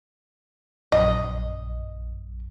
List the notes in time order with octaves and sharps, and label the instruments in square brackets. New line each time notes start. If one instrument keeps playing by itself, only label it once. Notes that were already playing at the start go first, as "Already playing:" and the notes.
[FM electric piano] A#1 F#2 [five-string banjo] D#5